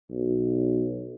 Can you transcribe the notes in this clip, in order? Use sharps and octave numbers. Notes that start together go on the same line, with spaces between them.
B1